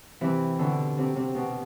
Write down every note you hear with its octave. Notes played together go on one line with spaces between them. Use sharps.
C3 E3
B2 D3
C3
C3
B2